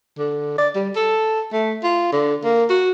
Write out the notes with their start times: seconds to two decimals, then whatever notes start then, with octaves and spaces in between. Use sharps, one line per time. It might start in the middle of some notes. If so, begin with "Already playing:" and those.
0.18 D3
0.58 D5
0.75 G3
0.96 A4
1.52 A3
1.83 F4
2.12 D3
2.44 A#3
2.69 F#4